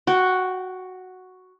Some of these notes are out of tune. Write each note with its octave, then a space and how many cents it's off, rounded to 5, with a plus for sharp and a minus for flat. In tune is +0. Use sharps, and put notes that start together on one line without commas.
F#4 +0 G5 -25